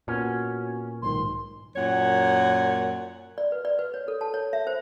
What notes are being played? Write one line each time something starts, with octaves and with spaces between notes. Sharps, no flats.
A#2 B3 C#4 F#4
B1 G#2 D#3 C6
F#2 A#2 C#5 F#5
D5
B4
D5
B4
C#5
A4
A5
C#5
E5
C5